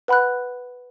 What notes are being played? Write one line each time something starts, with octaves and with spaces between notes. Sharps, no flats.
B4 F#5 B5 F#6